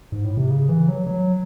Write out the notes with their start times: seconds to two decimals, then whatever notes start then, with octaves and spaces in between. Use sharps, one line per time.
0.12 G#2
0.25 A2
0.37 C3
0.50 C#3
0.69 E3
0.88 F#3
1.07 F#3